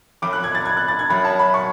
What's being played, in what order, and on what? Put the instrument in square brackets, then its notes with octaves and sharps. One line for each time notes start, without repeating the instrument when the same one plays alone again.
[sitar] F2 [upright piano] D6
[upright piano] F#6
G#6
A6
G#6
F#6
A6
G#6
[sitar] F#2 [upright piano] B5
[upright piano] A5
B5
C#6